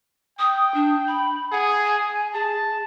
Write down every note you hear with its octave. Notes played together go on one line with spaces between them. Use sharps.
G5 D#6
D4
B5
G#4 F#5
G#5
G#4 A5